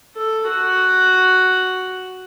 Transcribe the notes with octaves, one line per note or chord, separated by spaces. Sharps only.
A4
F#4